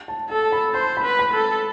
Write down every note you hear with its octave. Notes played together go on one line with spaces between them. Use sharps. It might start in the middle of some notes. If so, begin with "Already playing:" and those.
A5
A4 A5
B5
C5 C6
B5
B4
B5
A4